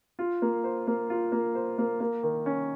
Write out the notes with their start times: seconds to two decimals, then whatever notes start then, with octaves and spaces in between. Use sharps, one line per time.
0.19 F4
0.42 A#3
0.64 C5
0.87 A#3
1.10 F4
1.32 A#3
1.55 C5
1.78 A#3
2.00 A#3
2.23 D#3
2.46 C#4